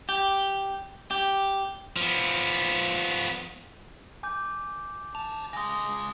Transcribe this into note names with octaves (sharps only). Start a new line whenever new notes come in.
G4
G4
F3 B3
G#5 D6 G6
E3 A5 F7
C#3 G#3 D#6 A#6